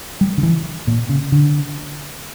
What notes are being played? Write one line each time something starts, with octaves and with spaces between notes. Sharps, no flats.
G3
D3
E3
A#2
C#3
D3